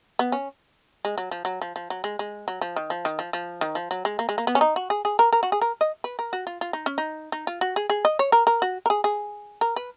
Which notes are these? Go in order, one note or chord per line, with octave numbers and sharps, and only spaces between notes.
B3
C#4
G#3
F#3
F3
F#3
F3
F3
F#3
G#3
G#3
F#3
F3
D#3
F3
D#3
F3
F3
D#3
F3
F#3
G#3
A#3
G#3
A#3
B3
C#4
D#4
F#4
G#4
G#4
A#4
A#4
F#4
G#4
A#4
D#5
B4
A#4
F#4
F4
F4
D#4
C#4
D#4
D#4
F4
F#4
G#4
G#4
D#5
C#5
A#4
A#4
F#4
A#4
G#4
G#4
A#4
B4